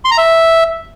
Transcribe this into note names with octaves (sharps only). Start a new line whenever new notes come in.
C6
A#5
E5